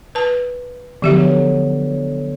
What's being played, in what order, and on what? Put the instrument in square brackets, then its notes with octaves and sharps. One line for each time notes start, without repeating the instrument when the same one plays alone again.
[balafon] B4 A5
[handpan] D3 F#3 B3 [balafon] F3 G4 E5